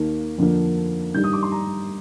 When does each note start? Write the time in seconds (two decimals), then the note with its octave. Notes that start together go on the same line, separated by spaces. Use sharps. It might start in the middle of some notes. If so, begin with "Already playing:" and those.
Already playing: D#2 D#3 A#3
0.38 F2 D3 F3 A#3
1.14 G2 D#3 G3 G6
1.24 D#6
1.33 D6
1.43 C6
1.52 A#5